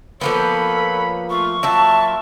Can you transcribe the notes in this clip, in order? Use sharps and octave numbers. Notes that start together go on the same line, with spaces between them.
F3 A#3 B3 A4 B4 C#5 B5
A3 F4 C#6
F#3 A#3 E4 F4 E5 A5